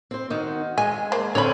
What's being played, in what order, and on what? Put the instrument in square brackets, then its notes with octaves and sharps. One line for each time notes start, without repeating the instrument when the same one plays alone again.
[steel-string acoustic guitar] C4 C5
D#3 F#4
[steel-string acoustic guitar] G#3 [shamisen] G#5
[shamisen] A#3 C5
[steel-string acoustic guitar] D3 C4 C#4 [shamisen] C#5 B5